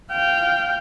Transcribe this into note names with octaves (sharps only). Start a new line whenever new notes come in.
F5 G5